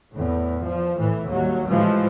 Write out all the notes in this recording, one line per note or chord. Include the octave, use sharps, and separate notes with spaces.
E2 A2
F3
A2 E3
D#2 F#3 G3 A#3
A2 E3 F3 G3 G#3